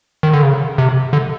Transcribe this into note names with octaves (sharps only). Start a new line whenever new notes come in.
D#3
D3
C#3
C3
D3